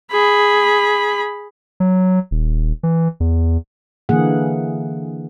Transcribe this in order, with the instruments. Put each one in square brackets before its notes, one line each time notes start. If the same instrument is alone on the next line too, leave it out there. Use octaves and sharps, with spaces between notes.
[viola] G#4 B5
[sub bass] F#3
D#1
E3
E2
[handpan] D3 E3 A#3 G#4 F#5